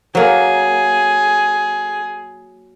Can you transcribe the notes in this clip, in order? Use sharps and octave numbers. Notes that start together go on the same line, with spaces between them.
F#3 A#3 G#4